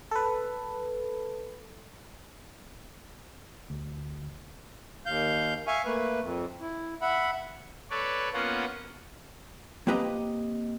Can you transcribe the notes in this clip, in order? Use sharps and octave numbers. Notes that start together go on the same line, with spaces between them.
A4 B4
D2
D#2 F5 G6
E5 F5 G#5 C#6
A3 A#3 B4
F2
E4
E5 F#5 B5
A4 B4 C#5 D5
A#3 B3 C#4 F4 F#5
A#3 C4 G4 B4 D#5 A#5